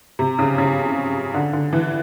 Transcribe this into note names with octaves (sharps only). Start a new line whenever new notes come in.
C3
C#3
C#3
D3
D3
E3